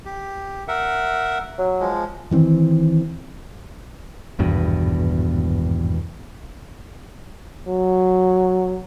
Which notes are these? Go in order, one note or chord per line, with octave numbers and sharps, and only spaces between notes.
G4
A#4 E5 F#5
F#3
F3 G#3
D#3 E3 B3 C4
G#1 E2 G2 B2
F#3